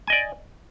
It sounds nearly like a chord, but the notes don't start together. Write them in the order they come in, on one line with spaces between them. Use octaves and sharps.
G#5 D#5 D5